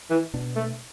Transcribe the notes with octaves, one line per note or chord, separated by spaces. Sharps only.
E3
B2 B3 D4
A3